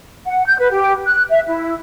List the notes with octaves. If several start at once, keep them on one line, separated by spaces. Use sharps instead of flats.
F#5
G6
B4
G4
F#6
E5
E4